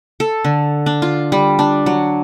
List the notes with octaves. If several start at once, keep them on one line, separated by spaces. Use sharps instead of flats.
A4
D3
D4
F4
G3
D4
F#3